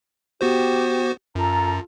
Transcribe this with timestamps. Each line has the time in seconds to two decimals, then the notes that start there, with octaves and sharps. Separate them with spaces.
0.41 B3 F#4 G4 C5
1.35 F#2 F4 A4 A#5